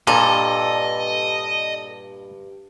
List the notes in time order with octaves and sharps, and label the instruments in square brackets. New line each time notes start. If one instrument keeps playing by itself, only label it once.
[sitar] G2 [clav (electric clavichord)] A#2 [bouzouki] A4 [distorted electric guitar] D#5